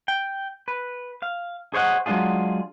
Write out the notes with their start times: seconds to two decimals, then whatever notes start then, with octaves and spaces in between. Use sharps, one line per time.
0.08 G5
0.68 B4
1.22 F5
1.74 G#4 C5 C#5 D#5 F5 F#5
2.06 F#3 G#3 A3 D4 F4 G#4